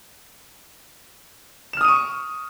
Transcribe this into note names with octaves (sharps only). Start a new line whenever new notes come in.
C#6 D#6 F6 D#7 E7